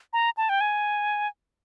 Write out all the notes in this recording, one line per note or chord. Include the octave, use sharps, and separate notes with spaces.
A#5
A5
G5
G#5